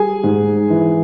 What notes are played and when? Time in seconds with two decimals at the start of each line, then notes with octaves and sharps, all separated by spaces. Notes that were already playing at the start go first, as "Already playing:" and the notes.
Already playing: G3 G#4 G#5
0.24 G#2
0.70 E3